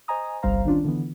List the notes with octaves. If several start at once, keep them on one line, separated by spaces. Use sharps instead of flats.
C5 D#5 G#5 A#5 D#6
G1 C2 G3 C5 F5 A#5
D#3 C#4 D4 F4
D3 E3 B3